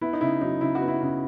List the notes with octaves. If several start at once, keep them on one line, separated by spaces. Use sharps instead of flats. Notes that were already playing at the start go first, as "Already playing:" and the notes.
B3 E4
D#4
C#3 E4
F#3 D#4
C#3 E4
F#4
B3
E4
C#3